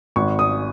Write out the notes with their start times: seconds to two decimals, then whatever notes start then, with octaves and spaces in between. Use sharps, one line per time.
0.16 G#1 C#6
0.39 D#6